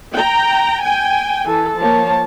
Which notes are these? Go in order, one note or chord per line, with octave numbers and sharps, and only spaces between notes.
G5 A#5
G5 G#5
E3 A4
F3 A#3 C#5 A5